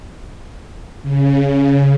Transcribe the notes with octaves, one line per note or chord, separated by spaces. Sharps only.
C#3